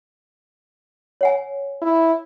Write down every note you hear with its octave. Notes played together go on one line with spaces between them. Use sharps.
C#5 F#5 G#5
E4